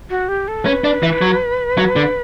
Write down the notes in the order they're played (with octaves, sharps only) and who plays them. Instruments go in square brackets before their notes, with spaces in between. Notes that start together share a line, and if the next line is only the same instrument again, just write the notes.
[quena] F#4
G4
A4
[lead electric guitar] C#4 [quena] B4
[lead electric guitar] D4
E3
F#3
F#3
D3